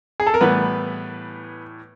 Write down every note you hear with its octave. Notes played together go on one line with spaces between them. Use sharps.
G#4
A4
A#4
A2 E3 G3 B3 B4